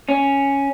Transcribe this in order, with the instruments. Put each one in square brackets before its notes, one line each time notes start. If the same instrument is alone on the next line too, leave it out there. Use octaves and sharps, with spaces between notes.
[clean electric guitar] C#4